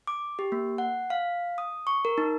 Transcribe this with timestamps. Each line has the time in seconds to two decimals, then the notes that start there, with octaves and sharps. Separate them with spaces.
0.07 D6
0.39 G4
0.52 A#3
0.78 F#5
1.10 F5
1.58 D#6
1.87 C#6
2.05 A#4
2.18 D#4